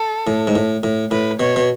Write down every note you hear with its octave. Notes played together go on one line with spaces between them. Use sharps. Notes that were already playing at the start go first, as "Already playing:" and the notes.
Already playing: A4
A2
G#2
A2
A2
A2 B4
B2 C#5
B2